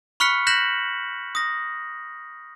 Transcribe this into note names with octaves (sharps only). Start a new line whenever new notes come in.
B5 C#6 F6 F#6 B6 C#7
F#6 G6 A#6 B6 E7 F#7
D#6 A#6